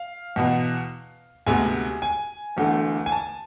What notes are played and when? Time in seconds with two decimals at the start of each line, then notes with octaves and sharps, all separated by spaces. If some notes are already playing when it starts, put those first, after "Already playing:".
Already playing: F5
0.36 E2 B2 B3
1.46 D2 C3 G#3 B3 G#5
2.02 G#5
2.57 E1 E2 D3 A3
3.06 G#5
3.12 A5